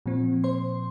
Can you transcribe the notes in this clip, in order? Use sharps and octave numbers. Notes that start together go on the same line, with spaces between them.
A#2 F3 C4
C5 C6